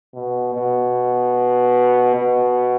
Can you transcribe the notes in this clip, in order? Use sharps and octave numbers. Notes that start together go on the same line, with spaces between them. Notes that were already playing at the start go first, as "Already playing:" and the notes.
B2
B2
B2